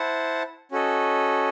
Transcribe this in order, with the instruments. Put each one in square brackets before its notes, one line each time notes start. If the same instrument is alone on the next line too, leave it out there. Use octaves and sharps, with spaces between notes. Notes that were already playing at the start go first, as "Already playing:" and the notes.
Already playing: [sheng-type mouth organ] E4 C5 F#5 A5
C#4 F#4 A4 D#5